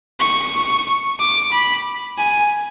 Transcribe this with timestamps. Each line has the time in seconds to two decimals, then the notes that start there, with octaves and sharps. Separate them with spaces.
0.20 C#6
1.19 D6
1.52 B5
2.18 G#5